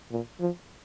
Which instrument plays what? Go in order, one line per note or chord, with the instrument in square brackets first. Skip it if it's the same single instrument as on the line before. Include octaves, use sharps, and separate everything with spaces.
[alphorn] A#2
F3